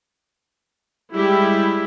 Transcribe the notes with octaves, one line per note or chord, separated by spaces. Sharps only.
G3 G#3 E4 G4